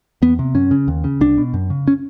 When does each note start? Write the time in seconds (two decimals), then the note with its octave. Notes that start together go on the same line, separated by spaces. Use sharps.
0.22 E2 B3
0.39 C3
0.55 F#2 C#4
0.71 C#3
0.88 D#2
1.04 C#3
1.21 C2 D4
1.38 B2
1.54 F#2
1.70 C#3
1.88 C#4